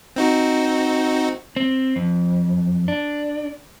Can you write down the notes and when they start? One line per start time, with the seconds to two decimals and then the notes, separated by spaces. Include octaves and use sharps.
0.16 C4 D#4 F#4
1.56 C4
1.96 F2
2.88 D4